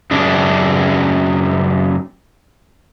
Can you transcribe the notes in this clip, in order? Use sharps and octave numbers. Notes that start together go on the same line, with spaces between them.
F#2 C#3 D4